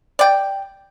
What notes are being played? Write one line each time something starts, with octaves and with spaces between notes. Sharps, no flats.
D5 G5